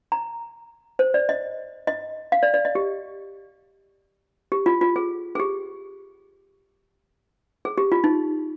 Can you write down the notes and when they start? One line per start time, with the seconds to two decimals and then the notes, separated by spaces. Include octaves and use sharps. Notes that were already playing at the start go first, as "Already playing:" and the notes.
0.12 A#5
0.99 C5
1.14 D5
1.29 D#5
1.87 D#5
2.32 F5
2.43 D5
2.54 D5
2.65 D#5
2.75 G4
4.52 G4
4.66 F4
4.81 F4
4.96 G#4
5.35 G#4
5.39 G4
7.65 G#4
7.78 G4
7.92 F4
8.04 D#4